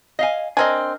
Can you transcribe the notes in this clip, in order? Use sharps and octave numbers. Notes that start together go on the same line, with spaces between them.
D#5 F5 G#5
C4 D4 A#4 D#5 G#5